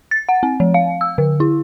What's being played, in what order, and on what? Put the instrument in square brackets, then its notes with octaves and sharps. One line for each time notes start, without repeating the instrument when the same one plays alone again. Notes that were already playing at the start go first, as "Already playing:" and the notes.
[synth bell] A6
F#5
C4
F3
F5
E6
D3
E4